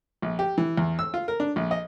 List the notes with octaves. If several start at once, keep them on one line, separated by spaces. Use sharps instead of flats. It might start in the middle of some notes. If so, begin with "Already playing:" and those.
A#1
G4
E3
E2
E6
F4
A#4
D4
A#1
D#5